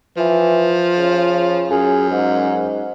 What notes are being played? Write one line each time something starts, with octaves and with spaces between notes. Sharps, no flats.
E3 F3
C#3
F#2 G#4
G#2